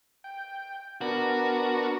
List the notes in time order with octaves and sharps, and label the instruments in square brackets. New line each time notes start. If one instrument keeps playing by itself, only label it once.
[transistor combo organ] G5
[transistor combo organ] B3 D4 A#4 [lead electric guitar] F#4